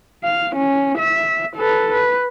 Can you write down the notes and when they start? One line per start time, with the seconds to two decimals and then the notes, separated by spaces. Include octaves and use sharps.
0.24 F5
0.56 C#4
0.99 E5
1.56 A4 B4
1.93 B4